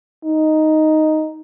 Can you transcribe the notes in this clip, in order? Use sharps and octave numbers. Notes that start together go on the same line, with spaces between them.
D#4